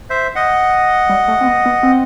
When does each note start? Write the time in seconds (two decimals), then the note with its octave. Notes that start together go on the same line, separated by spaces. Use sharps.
0.10 C5 E5
0.35 D#5 F#5
1.09 G3
1.28 A3
1.41 C4
1.46 B3
1.66 B3
1.83 C4